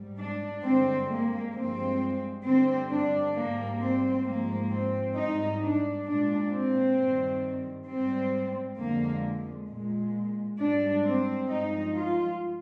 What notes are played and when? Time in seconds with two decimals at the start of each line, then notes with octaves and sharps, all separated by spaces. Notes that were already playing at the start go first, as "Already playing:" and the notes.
Already playing: G#2 G3
0.18 D4
0.63 G2 D3 G#3 C4
1.09 A#3
1.54 G2 F3 G#3 C4
2.45 G2 D3 G3 C4
2.90 D4
3.34 G#2 G3 A#3
3.80 C4
4.25 G#2 F3 G#3 A#3
4.71 C4
5.16 G#2 G3 D#4
5.61 D4
6.06 A#2 G#3 D4
6.52 C4
6.97 G2 D#3 G3
7.87 G#2 G3 C4
8.78 F2 D3 G#3 A#3
9.68 A#2 G#3
10.59 G#2 G3 D4
11.04 C4
11.49 G2 F3 G#3 D#4
11.95 F4